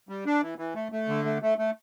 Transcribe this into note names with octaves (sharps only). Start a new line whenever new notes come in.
G3
D4
E3
E3
A3
A3
D3
A3
A3
A3